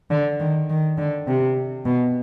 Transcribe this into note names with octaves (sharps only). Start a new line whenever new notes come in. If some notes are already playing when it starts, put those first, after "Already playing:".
D3
D#3
D#3
D3
C3
B2